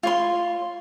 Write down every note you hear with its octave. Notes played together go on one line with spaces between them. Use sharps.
F4 C#5 C6